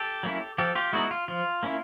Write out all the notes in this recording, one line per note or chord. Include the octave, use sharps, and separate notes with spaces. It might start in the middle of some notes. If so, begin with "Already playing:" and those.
Already playing: G4 A4
F#3 A#3 C#4 E4
F3 G4 A4
F4 G4
G#3 B3 D#4 E4 F#4
F4
F3 F4
A#3 C#4 E4